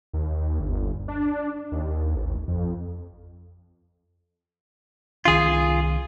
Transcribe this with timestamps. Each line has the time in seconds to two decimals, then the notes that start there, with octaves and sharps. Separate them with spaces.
0.13 D#2
0.60 G1
1.08 D4
1.72 D#2
2.16 A1
2.48 F2
5.25 C2 D#3 C#4 F4 G#4